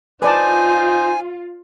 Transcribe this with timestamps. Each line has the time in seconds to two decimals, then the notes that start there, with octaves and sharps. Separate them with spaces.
0.22 D#4 F4 B4 C5 D5 G#5 A5